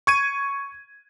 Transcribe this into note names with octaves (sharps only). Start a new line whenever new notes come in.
C#6 G#6 D#7